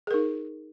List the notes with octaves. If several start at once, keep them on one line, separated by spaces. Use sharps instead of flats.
D#4 G#4 A#4